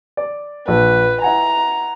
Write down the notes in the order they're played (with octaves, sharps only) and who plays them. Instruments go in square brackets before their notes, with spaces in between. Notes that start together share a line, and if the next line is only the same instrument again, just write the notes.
[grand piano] D5
[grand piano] A#1 [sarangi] B4
[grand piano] E4 F#5 G#5 [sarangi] A#5